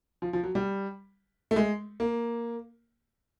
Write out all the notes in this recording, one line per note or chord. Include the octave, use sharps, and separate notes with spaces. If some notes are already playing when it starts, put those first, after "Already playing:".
F3
F3
F#3
G3
A3
G#3
A#3